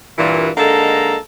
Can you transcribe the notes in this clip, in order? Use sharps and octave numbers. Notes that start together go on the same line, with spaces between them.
G2 A#2 E3
D3 G#3 A#3 D#4 A4 A#5